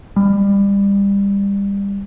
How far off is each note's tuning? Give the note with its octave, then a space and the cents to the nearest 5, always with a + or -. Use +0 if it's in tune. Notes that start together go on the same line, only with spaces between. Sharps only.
G3 +25